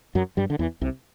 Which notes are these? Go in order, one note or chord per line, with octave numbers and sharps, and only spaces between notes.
F#2 F#3
G2 G3
D3
E2 E3
C2 C3